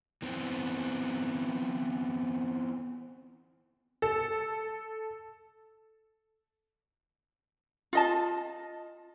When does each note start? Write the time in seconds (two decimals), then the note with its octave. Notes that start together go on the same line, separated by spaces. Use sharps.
0.22 E3 B3 C4
4.02 A4
7.93 F4 D#5 A5